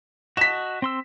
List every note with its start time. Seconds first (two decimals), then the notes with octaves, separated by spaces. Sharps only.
0.37 F#4 D#5 A5 B6 E7
0.82 C4 C6 E6